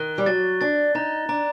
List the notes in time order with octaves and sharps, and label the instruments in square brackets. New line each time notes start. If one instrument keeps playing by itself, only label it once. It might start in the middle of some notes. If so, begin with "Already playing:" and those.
Already playing: [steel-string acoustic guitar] D#3 [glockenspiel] F#6 G7
[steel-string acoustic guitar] G3
[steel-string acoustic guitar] F#3 [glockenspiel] A6
[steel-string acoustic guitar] D4 [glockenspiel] A6
[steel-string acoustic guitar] D#4 [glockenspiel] A#5
[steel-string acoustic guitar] D4 [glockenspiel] A#5